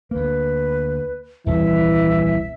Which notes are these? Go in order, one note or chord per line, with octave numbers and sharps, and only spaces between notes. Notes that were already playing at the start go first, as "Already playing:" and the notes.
D2 A#3 B4
D#1 C2 E3 E5